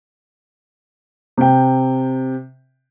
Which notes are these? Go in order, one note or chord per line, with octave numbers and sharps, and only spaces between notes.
C3 G5